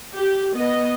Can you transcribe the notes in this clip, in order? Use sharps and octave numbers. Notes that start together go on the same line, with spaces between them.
G4
B3 D#5